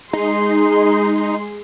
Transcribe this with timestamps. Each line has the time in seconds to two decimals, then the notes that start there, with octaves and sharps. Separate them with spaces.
0.13 G#3 D#4 G#4 C6